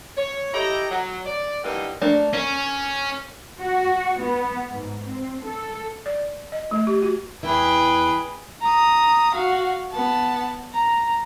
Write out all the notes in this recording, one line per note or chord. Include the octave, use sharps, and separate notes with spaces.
C#5
E4 G4 A4 D#5 G5 A#5
F#3
D5
D3 E3 G3 A#3 C4 D#4
A3 A#3 D4
A#3 C#4
F#4
B3
G#2
C4
A4
D5
D#5
A3
G4
F#4
E2 E4 G#4 B4 G5
A#5 D#6
F#4 F5
B3 A5
A#5